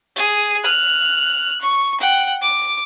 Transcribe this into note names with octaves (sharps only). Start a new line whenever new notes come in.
G#4
F6 F#6
C#6
F#5 G5
D6